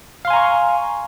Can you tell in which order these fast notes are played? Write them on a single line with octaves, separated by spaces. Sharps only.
F5 C6 G#5 A#5 C#6